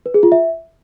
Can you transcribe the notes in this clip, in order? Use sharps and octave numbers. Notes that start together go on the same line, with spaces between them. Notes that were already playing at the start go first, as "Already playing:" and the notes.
B4
G#4
F4
E5